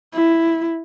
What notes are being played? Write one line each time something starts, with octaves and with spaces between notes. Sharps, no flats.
E4